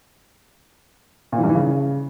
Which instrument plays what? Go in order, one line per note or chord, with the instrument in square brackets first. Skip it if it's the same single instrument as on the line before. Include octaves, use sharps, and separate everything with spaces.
[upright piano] A#2
E3
G2
E3
C#3